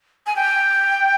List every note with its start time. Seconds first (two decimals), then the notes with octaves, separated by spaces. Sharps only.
0.27 G#5
0.36 G5